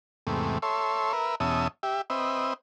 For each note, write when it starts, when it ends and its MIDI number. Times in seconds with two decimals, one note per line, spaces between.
0.27 0.58 40
0.27 0.58 44
0.27 0.58 48
0.27 0.58 57
0.62 1.13 69
0.62 1.13 73
0.62 1.13 76
0.62 1.13 84
1.13 1.35 70
1.13 1.35 71
1.13 1.35 76
1.40 1.68 40
1.40 1.68 47
1.40 1.68 61
1.40 1.68 76
1.40 1.68 81
1.40 1.68 87
1.83 2.01 67
1.83 2.01 76
2.10 2.53 60
2.10 2.53 71
2.10 2.53 75
2.10 2.53 76